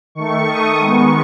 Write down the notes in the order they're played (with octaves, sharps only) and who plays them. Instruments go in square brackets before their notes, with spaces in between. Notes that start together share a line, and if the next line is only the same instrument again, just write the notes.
[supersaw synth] D#3 A3 C#6
D#6
D#3 G#3 B3 C#6